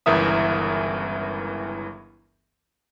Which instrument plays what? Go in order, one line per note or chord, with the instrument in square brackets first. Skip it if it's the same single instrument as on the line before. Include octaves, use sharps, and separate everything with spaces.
[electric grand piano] G1 C#2 E3 A#4 E5 D#6